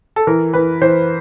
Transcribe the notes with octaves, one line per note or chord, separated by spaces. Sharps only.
A4
E3 A#4
E3 B4
E3 C5